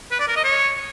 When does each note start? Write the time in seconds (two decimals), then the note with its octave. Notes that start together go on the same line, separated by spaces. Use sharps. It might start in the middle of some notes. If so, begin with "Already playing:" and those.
0.11 B4
0.20 D5
0.28 A#4
0.36 D#5
0.44 C#5